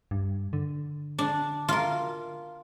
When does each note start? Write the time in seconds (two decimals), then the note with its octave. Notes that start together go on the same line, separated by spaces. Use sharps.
0.11 G2
0.53 D3
1.19 D4
1.69 F4 A#4